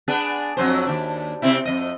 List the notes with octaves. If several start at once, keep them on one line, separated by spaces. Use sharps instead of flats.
B3 D4 G#4
F2 F#3 C5
D#2 D4
C3 C4 E4
F2 D#5